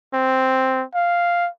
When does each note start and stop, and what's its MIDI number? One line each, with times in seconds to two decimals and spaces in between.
0.14 0.84 60
0.95 1.49 77